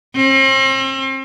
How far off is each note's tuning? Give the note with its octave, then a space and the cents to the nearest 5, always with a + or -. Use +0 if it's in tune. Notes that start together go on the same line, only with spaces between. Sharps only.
C4 +40